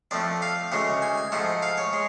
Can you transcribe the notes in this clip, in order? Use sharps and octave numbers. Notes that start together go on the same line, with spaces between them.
F2 F3 A3 D5
F5
D2 C#3 G#3 F#5
G#5
G#5
G#2 F3 A3 F#5
F5
C#5
G#3